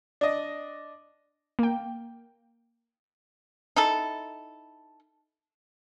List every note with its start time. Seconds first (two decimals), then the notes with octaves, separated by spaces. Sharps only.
0.21 D4 D#5
1.59 A#3 G5
3.76 D#4 E4 A4